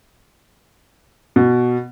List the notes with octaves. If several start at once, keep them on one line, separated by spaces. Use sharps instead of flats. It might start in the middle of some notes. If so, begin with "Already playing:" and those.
B2